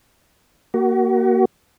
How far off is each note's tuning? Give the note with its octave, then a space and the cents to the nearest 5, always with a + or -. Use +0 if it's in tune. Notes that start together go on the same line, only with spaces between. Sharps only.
A#3 +0 F#4 +30